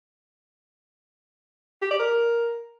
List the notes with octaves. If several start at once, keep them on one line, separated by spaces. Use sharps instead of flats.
G4
D5
A#4